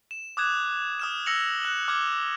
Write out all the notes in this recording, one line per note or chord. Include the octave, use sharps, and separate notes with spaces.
E7
D6 D#6 F#6 G#6 E7
D#6 F6 E7
E6 A#6 C#7 F7 F#7
F#6 E7 F#7
D6 F6 G#6